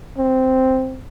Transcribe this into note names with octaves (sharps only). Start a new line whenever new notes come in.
C4